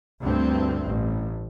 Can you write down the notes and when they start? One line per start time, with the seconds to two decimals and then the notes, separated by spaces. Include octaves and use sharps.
0.21 D2 G2 C4
0.85 A1